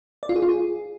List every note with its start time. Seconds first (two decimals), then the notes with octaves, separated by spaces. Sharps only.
0.23 D5
0.29 F4
0.36 G#4
0.42 F4
0.49 G#4